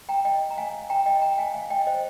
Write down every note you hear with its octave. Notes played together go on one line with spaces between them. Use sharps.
G5 A#5
D#5 G5
A#5
F5 G#5
G5 A#5
D#5 G5
G5 A#5
F5 G#5
F5 G#5
D#5 G5
C5 D#5